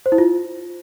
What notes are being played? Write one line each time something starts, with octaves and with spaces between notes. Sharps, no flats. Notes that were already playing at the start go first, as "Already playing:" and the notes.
C5
E4
F4